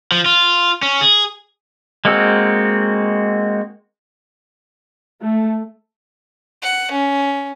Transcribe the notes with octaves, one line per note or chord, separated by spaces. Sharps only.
F3
F4
C#4
G#4
G#3 A#3 C4 F#4 E6
A3
F#5
C#4